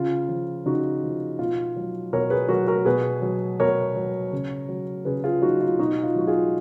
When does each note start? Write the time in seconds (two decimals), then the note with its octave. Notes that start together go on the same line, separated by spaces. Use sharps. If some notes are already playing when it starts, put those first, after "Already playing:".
Already playing: C#3 F4
0.29 F3
0.65 C#3 D#4 F#4
1.03 F3
1.39 B2 F4
1.76 F#3
2.13 B2 A#4 C#5
2.30 G#4 B4
2.49 F#3 F#4 A#4
2.67 F#4 A#4
2.85 B2 G#4 B4
3.22 F#3
3.59 B2 A#4 C#5
3.96 F#3
4.32 C#3
4.69 F#3
5.05 C#3 G#4 B4
5.24 F4 G#4
5.42 F#3 D#4 F#4
5.61 F4
5.79 B2 D#4 F#4
6.03 F4
6.16 F#3 F#4
6.27 F4 G#4